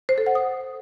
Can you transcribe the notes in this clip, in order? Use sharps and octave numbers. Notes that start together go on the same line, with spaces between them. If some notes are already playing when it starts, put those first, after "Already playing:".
C5
A4
F#5
D#6